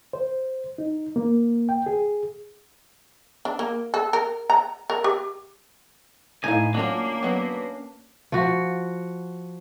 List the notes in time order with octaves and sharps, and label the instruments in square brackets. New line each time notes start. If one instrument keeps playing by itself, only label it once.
[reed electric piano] C5
D#4
A#3
G5
G#4
[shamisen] D4
A#3
A4
A#4
A#5
A#4
G4
[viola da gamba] A2 [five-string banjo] D#4 E4 F5 [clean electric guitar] G#5
[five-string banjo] F#3 F4 [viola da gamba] A#3 [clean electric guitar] C#4 D4
[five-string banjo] F#3 B3
[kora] F3 F#4